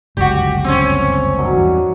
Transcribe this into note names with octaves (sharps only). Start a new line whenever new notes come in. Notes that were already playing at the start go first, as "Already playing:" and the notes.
G1 C#2 F#2 F#4 G4 D5
C4 C#4
D#3 F#3 D4
E2 G2 E3